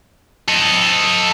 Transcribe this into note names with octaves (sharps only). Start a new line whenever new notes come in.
A4 D#5